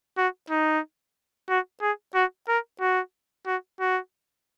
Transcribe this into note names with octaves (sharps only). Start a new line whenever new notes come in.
F#4
D#4
F#4
G#4
F#4
A#4
F#4
F#4
F#4